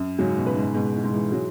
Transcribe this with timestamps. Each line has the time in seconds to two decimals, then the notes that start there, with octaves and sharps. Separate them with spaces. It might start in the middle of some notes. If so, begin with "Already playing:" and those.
Already playing: F#2
0.18 G#2 C#3 F#3
0.37 B2
0.46 B4
0.56 G#2
0.75 G#2 B2
0.94 B2 E3
1.04 G#2
1.13 E3 G#3
1.32 E3 F#3 G#3